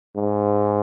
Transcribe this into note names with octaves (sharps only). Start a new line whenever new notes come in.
G#2